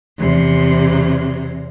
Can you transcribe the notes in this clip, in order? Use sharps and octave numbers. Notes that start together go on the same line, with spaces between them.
E2 C3